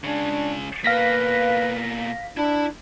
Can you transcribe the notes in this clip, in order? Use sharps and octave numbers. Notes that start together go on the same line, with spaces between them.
C#3 G#3 D4
B2 A#3 B4 F5 A#6 B6
D4 E4 B5